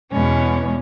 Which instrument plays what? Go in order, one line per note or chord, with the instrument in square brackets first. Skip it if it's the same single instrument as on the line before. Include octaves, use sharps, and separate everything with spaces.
[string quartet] E2 B2 G#3 C#4